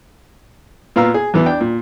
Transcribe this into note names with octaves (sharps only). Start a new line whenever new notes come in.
A#2 B3 F5 A#5 E6
G#4
E2 E3 B3
D4 G5
A#2